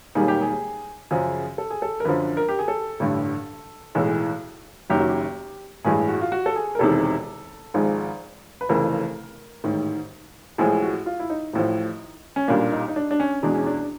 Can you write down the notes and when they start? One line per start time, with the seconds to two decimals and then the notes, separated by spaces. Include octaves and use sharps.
0.15 E1 D#2 D#3 G3 A#3 G#4
0.28 G4
0.42 G#4
1.11 F#2 C#3 F3 G#4
1.58 A4
1.70 G#4
1.82 A4
2.00 A#4
2.05 F#2 D3 F3 B4
2.37 A#4
2.49 G4
2.59 G#4
2.68 A4
3.00 A1 G2 D3
3.95 B1 A2 E3 G#3
4.90 F#1 F#2 D#3 F#3 G4
5.00 F#4
5.09 G4
5.84 A1 G2 E3 G#3 G#4
6.08 F#4
6.21 F4
6.32 F#4
6.46 A4
6.56 G#4
6.75 A#4
6.79 E1 E2 C3 D#3 A4
7.74 G#1 G#2 F3 G#3
8.61 B4
8.69 F1 F2 C#3 E3 A#4
9.64 A1 G#2 D#3
10.58 A1 A2 F3 G#3 G#4
10.82 F#4
11.06 F4
11.20 E4
11.30 D#4
11.53 A1 A2 F3
12.36 C#4
12.48 B1 A#2 G3 A#3 D4
12.72 D#4
12.88 D#4
12.96 D4
13.11 D4
13.20 C#4
13.43 E2 B2 G#3 D4
13.55 C#4
13.66 D4